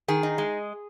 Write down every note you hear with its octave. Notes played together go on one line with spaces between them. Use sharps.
D#3 G#4
D#4
G#3